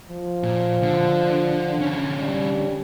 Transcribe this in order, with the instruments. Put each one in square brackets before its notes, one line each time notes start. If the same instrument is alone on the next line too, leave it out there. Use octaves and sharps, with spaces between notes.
[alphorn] F3
[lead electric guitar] A#2
D3
D3 C#4
[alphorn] G3